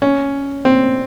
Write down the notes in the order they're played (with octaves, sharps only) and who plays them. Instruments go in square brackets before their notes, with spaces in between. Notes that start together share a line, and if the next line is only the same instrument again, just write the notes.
[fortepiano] C#4
C4